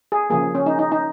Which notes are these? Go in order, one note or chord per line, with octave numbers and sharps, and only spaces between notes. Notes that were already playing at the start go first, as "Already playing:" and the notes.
G#4
C#3 F3 A#3 G#4
C#4
D#4
D#4
D#4